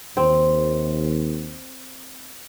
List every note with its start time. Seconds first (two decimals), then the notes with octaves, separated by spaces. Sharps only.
0.17 D#2 C4